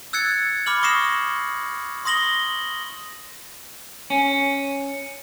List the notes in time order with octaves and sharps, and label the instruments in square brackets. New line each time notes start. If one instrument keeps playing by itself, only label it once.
[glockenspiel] E6 F#6 G#6 A6 C#7
B5 D6 F6 F#7
C#6 D#6 A#6 C7 E7
C6 D#6 A#6 F#7 G7
[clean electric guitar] C#4